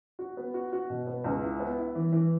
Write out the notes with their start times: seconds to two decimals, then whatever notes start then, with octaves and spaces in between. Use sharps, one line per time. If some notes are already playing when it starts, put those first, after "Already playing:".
0.19 F#4
0.37 B3
0.54 F#4
0.72 F#4
0.90 B2
1.07 B3
1.24 C#2
1.42 E4
1.60 B3
1.78 E4
1.95 E3
2.12 E3